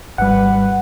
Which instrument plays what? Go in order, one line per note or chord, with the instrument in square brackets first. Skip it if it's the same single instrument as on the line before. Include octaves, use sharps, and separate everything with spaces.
[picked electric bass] G#1 G3 [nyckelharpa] B4 [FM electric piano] F#5